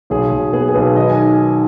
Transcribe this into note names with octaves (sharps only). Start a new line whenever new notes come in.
B1 G#4
B1
B3 G#4
G#4
B1 B4
D#3 D#5
G#5